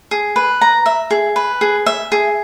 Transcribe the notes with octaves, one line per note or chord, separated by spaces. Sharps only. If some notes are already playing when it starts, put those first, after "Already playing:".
G#4
B4
A#5
E5
G#4
B4
G#4
E5
G#4